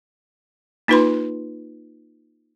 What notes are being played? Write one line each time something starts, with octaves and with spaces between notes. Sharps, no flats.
A#3 D#4 F4 B4 B5 C6